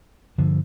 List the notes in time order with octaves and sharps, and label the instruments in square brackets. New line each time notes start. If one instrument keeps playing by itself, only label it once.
[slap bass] G2 D3 F3